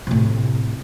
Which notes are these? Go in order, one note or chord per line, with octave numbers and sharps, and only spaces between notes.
A2 C3